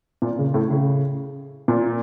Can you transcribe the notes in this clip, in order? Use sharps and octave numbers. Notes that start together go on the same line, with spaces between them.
A#2
C#3
A2
C#3
A#2